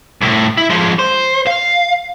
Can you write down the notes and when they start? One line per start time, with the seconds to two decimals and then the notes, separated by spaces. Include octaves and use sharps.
0.21 C2 A2
0.57 E4
0.70 F3 G#3
0.99 C5
1.47 F5